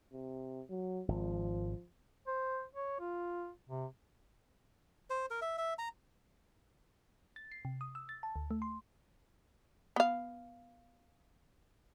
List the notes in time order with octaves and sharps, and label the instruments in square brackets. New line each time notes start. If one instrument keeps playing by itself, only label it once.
[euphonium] C3
F#3
[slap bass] G#1 [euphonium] F3
[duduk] C5
C#5
F4
C3
[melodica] C5
A#4
E5
E5
A#5
[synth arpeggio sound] A6
C7
C3
D#6
E6
A6
A5
D2
A3
C6
[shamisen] B3 F5